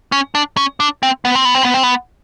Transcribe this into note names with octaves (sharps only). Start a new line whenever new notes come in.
C#4
D4
C#4
D4
C4
B3
C4
B3
C4
B3
C4
B3